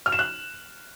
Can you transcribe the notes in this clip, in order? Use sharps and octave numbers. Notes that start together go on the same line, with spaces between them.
F6
E7
F#6